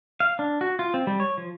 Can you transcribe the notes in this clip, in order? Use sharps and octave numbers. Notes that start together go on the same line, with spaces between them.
F5
D4
F#4
F4
C4
G3
C#5
F3